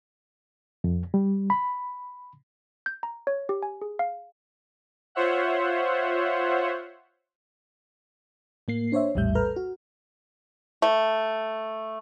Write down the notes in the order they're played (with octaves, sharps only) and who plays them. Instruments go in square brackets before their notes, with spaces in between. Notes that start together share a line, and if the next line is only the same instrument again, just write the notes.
[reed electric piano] F2
G3
B5
[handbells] G6
A#5
C#5
G4
G#5
G#4
F5
[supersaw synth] F4 C5 C#5 E5 F#5
[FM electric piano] A2 A#3 C7
D4 C5 C#5 E5
A#1 E2 A2 G3 E5 G6
A4 B4 A#5 F6
F#4
[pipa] A3